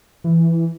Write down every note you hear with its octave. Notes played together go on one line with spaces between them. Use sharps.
E3